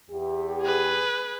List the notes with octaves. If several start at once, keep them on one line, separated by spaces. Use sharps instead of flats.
E2 G4
G#4 B4